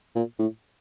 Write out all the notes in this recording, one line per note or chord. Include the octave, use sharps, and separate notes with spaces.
A#2
A2